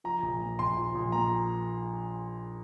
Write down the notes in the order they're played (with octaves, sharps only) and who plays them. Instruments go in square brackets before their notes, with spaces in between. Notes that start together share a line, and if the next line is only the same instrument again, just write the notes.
[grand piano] F3 A#5
A#1
A#2
A#1 C6
F3
A#1
A#2 A#5